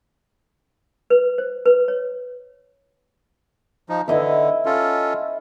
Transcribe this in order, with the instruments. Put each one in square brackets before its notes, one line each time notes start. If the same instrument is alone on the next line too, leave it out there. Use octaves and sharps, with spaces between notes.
[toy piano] B4
C5
B4
C#5
[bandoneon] F3 D#4
[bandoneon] D3 [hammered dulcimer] E4 D#5 E5
[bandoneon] C#4 F4 A4